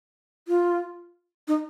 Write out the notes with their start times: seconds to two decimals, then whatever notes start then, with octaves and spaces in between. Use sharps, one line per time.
0.48 F4
1.48 D#4